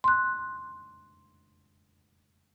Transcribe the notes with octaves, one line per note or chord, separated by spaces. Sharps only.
C6 F#6